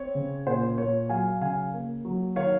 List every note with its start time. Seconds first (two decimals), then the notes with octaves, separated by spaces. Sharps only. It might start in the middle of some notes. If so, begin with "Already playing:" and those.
Already playing: C4 C#5
0.15 C#3
0.46 A#2 C5
0.78 A#2 C#5
1.09 F#3 F5 G#5
1.41 C#3 F5 G#5
1.73 A#3
2.05 F#3
2.36 D#3 C#5 F5